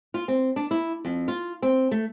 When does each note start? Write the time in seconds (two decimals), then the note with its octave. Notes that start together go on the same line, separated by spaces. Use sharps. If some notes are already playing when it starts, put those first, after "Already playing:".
0.14 F4
0.28 C4
0.56 D4
0.71 E4
1.05 F2
1.28 F4
1.62 C4
1.91 A3